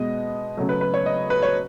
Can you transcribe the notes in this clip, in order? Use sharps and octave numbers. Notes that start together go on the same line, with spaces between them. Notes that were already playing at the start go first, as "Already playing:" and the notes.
Already playing: B2 G#3 B3 D#5
C#3 F#3 A3
B4
B4
C#5
D#5
B4
C#5